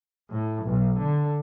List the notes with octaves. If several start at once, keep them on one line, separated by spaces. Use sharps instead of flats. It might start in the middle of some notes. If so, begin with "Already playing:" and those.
A2
B1
D3